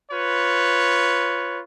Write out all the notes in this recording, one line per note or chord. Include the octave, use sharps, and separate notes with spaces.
F4 B4 C#5